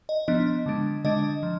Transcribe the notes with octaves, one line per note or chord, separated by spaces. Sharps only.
D#5
F3 B3 D4 D#5
D3 G#3 D4
D3 G#3 D4 D#5
F3